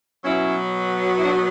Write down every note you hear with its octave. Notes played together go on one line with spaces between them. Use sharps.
B2 F#3 B3 C#4 E4
E4
D4 F#4